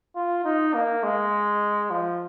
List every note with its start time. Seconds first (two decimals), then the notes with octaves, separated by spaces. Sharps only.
0.16 F4
0.44 D#4
0.74 A#3
1.03 G#3
1.90 F3